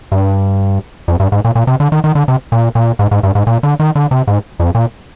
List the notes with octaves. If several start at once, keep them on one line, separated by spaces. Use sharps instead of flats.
G2
F2
G2
G#2
A#2
A#2
C3
D3
D#3
D#3
D3
C3
A#2
A#2
G#2
G#2
G2
G#2
A#2
D3
D#3
D3
C3
G#2
F2
A#2